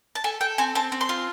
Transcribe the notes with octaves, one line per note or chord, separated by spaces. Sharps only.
A5
A4 G#5
A4 G5
C4 G#5
C4 A5
C4
C6
F4